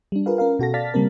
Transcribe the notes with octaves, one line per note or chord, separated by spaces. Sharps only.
G3 D4
F4 G#4 A#4 B4 F5
C#4 A#4 F5
B2 F#4 A4 A#6
D5 F5 A5 F6 A6 B6
C#3 G3 A#3 C4 A#4